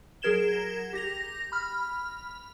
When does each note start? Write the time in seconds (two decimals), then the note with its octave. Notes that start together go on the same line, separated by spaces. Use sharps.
0.22 F#3 G#4 A#4 G#6 E7 G7
0.93 G4 A#6 F7
1.52 B5 F6